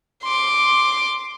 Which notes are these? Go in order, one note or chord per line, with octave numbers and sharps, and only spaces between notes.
C6 D6